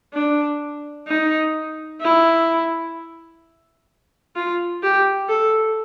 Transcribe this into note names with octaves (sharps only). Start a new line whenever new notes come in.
D4
D#4
E4
F4
G4
A4